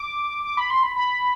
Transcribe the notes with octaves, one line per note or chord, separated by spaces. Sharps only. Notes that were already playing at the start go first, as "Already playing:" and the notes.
Already playing: D6
D6
B5
C6
B5
B5